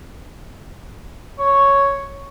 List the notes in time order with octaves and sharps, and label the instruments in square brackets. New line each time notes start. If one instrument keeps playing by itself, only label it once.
[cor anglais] C#5